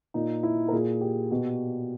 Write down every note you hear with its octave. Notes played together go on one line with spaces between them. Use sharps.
A#2 D#4
E4
A#4
A#2 G#4
G4
B2